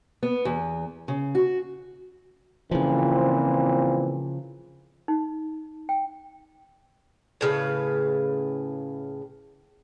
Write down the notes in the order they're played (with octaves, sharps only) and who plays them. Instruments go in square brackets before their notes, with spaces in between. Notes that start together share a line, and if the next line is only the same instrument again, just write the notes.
[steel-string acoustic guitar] B3
E2
C#3
F#4
[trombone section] A#2 E3 C4 [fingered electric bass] C#3 F3
[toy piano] D#4
G5
[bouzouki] A2 C#3 B4